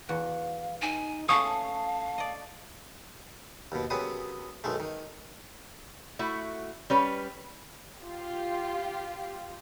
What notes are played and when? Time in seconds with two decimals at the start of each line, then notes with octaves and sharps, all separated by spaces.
0.09 E2 F#4 F5
0.82 D#4 G#5
1.29 A3 C#4 F5 A5 C#6 D#6
2.18 D5 D#5
3.72 D#2 B2
3.90 F#2 C3 F#3 B3 G#4 D#6
4.64 B1 D#3 G#3 A3
4.80 D#3
6.19 A3 E4 F#4
6.90 G3 C#4 B4
7.99 F4 G4